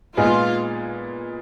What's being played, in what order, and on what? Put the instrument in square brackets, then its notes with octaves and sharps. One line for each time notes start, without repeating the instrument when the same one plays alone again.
[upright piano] A#2 G#3 B3 D#4 G#4 [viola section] F4